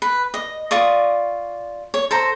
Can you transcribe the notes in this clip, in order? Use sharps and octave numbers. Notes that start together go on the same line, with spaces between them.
B4
D#5
F4 D5 C#6 D#6
C#5
A4 C5 A#5